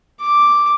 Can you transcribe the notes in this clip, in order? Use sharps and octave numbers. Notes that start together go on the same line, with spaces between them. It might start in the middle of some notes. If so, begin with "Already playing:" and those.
D6